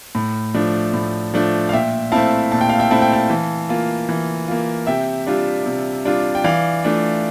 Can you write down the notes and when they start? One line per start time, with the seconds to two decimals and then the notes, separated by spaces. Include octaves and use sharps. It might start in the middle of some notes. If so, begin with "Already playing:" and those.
0.15 A2
0.54 F3 A3 D4
0.94 A2
1.34 F3 A3 D4
1.69 F5
1.73 A#2 E5 G5
2.12 A3 C4 E4 F5 A5
2.52 A#2 A5
2.61 G5
2.70 F5
2.79 E5 G5
2.90 A3 C4 E4 A5
3.02 G5
3.12 F5 A5
3.30 E3
3.69 A#3 F4
4.09 E3
4.48 A#3 F4
4.87 C3 E5 G5
5.26 G3 D4 F4
5.66 C3
6.05 G3 D4 F4
6.35 G5
6.44 E3 D5 F5
6.84 A3 D4 F4